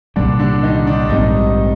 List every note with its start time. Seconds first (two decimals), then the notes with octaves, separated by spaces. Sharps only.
0.16 C2 A#2 D3 G3 D4
0.39 D3 D4
0.63 D#3 D#4
0.86 D3 D4
1.09 A#1 G#2 D#3 G3 C4 D#4